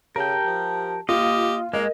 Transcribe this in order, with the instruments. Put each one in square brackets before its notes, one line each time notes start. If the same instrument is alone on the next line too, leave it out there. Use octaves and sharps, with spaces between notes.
[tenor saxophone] C#3 [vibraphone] G4 A5 [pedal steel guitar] A#4 G5
[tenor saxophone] F3
[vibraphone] A#3 [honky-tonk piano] F4 [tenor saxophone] G4 [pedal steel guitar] D#5
[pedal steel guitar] G#3 [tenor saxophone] A#3 [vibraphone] A#4 [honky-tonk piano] D#5